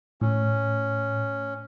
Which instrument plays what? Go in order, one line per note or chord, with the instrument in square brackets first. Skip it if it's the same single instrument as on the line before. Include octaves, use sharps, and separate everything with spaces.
[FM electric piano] A2 [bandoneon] C#4